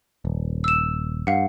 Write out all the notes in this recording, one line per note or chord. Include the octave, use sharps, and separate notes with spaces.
D#1
E6 E7
G2 F5 F#5